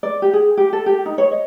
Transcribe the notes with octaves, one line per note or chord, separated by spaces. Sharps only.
D5
G4
G#4
G4
A4
G4
D#4
C#5
D#5